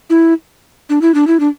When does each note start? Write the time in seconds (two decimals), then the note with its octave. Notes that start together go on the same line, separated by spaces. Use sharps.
0.10 E4
0.89 D4
1.02 E4
1.14 D4
1.27 E4
1.40 D4